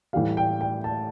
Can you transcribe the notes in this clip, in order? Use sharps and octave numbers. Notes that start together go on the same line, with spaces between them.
A2 E3 G3 F5
G5
G5
A5